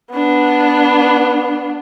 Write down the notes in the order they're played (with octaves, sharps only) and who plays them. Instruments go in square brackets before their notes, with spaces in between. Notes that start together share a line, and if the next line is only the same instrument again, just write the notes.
[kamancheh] B3 D4